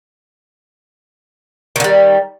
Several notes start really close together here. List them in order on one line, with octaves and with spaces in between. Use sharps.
D#3 D3 G3